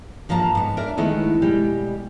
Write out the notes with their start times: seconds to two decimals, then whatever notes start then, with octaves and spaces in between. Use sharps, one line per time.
0.29 G2 F3 A#3 A5 A#5
0.55 G#2 B3
0.77 D4 A#4 D5 E5
0.97 D#3 G#3 A3 B3 D#4 E4
1.42 B2 G3 G#3 G4